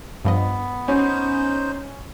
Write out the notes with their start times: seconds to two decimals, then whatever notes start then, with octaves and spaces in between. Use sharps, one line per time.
0.25 G2 F3 B3 D#5
0.88 C#4 D#4 C5